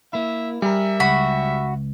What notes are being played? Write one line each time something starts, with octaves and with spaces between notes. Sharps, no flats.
A#3 E4 E5
G3 G#4 A#4 E5
C#2 F#4 B5